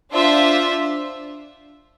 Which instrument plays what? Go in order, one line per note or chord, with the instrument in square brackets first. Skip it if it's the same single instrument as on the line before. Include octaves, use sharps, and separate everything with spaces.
[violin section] D4 F4 C5 E5